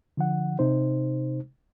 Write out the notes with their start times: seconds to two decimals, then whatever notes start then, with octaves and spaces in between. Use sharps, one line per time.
0.17 D3 F3 F#5
0.59 C3 D#4 C5